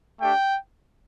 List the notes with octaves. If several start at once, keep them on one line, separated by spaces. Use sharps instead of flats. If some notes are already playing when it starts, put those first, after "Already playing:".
A3 D4 G4 G5